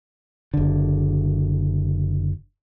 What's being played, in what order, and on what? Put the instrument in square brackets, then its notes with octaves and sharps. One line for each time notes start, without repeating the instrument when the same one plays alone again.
[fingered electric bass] F#1 D3